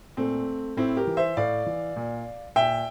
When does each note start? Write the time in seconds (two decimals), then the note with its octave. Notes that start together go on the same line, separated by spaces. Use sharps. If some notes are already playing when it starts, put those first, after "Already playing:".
0.17 A#2 A3 C4
0.77 A2 C4 E4
0.97 G4 A#4
1.07 E3
1.17 C5 E5
1.37 A2 D5 F5
1.66 E3
1.96 A#2
2.56 A#2 E5 G5